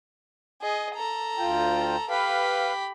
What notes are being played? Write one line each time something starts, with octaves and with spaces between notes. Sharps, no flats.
G#4 D#5
A4 A#5
D2 F4 G5
G4 B4 F5 B5